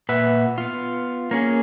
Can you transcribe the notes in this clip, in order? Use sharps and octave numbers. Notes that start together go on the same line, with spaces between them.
A#2 B4 E5 F#5
B3 F4
A#3 C#4 G#4